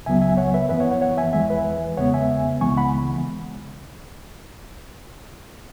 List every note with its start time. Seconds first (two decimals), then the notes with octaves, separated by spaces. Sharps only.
0.05 C#2 C#3 F#3 B3 E5 G#5
0.21 E5 G#5
0.37 C#5 F#5
0.54 B4 E5
0.69 F#2 E3 B3 B4 E5
0.80 C#5 F#5
0.91 C#5 F#5
1.01 C#5 F#5
1.17 E5 G#5
1.33 E2 E3 G#3 E5 G#5
1.49 B4 E5
1.97 E2 C#3 G#3 B3 C#5 F#5
2.14 E5 G#5
2.61 C#2 C#3 E3 G#3 B3 G#5 C#6
2.77 F#5 B5